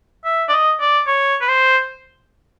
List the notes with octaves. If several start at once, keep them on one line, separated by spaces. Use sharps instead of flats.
E5
D5
D#5
D5
C#5
B4
C5